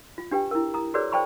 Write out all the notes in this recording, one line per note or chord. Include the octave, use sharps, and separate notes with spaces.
F4
D4 G4 B4 G5
E4 A#4
A#5 D#6
F#4 G#4 A#4 B4 C#5 D5
C5 D5 G5 A5 B5 C#6